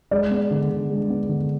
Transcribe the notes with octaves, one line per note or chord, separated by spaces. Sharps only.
G#3 D5
B3
D3
D3
G#3
B3
D3